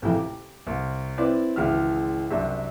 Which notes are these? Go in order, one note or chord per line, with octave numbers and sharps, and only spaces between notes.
A1 F2 C3 E4 G5
G4
C2
C4 E4 B4 D5
G#1 C#2 E3 E5 F6
C2 F#2 G3 D4 E5